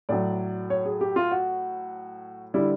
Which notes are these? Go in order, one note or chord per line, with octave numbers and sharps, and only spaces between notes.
A2 F#3 D5
C#5
G#4
G4
F4
F#4
D3 G3 E4